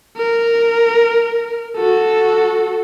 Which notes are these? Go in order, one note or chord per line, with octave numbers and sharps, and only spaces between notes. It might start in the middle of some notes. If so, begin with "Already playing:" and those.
A#4
F#4 A4